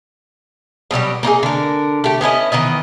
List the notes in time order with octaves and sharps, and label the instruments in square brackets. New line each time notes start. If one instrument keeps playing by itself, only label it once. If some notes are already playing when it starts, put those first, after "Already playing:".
[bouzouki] B2 F#3 G3 G4
A#3 D#4 G4 G#4
D3 A#4
A3 G4
B3 C#4 E4 D#5
D#3 E3 B3 D#5